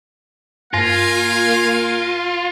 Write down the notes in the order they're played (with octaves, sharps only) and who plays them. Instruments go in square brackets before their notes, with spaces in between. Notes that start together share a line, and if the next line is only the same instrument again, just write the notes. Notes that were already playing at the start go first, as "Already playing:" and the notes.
[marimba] G2 [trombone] A#3 [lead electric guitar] F4 [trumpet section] A#4 F5 G#5